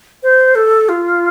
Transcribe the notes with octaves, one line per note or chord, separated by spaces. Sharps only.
C5
A4
F4